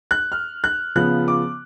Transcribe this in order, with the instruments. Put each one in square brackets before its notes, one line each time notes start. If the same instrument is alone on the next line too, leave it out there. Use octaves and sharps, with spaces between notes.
[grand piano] F#6
F6
F#6
C#3 F3 B3 F#6
D6